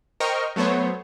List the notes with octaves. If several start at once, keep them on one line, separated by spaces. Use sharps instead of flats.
A#4 C5 D#5 G5 C#6 F6
F#3 A3 B3 C5 C#5